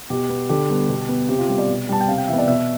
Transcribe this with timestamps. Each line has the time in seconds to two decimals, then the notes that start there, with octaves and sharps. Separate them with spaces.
0.10 B2 G4
0.29 B3
0.49 D3 G4
0.69 G3 B3
0.89 B2
1.09 B3
1.29 C3 G4
1.39 F4
1.48 G3 B3 G4
1.58 D5
1.68 B2
1.89 G3 B3 A5
2.00 G5
2.08 C3 F5
2.18 G5
2.28 E3 B3 E5
2.38 D5
2.47 B2 E5